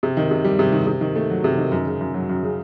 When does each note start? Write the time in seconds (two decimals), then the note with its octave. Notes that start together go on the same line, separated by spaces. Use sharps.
0.03 C3
0.17 D#3
0.31 C3
0.44 G3
0.59 C3
0.72 D#3
0.87 C3
1.01 D#3
1.16 A3
1.30 F#3
1.44 C3
1.58 D#3
1.72 F#2
1.86 C#3
2.00 F#2
2.14 F#3
2.29 F#2
2.43 C#3